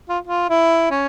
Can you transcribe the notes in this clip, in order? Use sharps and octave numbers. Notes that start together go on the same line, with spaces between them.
F4
F4
E4
C#4